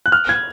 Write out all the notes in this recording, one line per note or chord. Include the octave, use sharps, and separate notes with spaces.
F#6
F6
G#6